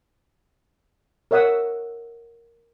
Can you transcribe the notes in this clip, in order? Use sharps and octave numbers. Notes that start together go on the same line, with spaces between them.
A#4 C#5 E5 F#5 D#6 E6